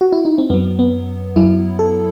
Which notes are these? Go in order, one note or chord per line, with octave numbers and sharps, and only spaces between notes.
F#4
E4
D#4
C4
F#2 F#3 B3
B3
F#2 F#3 E4
A4